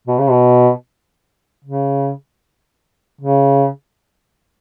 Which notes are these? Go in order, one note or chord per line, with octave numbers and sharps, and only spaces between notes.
B2
C#3
B2
C#3
C#3